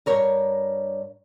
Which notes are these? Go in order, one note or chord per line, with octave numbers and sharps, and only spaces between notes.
G2 A#4 C#5